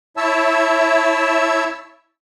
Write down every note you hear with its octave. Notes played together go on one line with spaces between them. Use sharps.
E4 C#5 E5 A5 E6